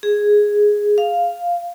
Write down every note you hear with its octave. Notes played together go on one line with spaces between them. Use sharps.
G#4
F5